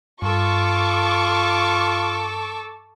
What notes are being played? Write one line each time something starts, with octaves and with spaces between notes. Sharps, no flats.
G2 F4 A4 C#6 D6